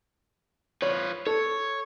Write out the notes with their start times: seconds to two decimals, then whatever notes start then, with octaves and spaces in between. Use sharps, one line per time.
0.82 F3 B4 C#5
1.27 A4 C#5